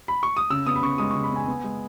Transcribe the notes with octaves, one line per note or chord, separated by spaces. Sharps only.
B5
C#6
D#6
C#3 E6
B3 D#6
B5
C#3 C#6
G#3 D#6
C#3 C#6
B5
B3
G#5
B3
G#3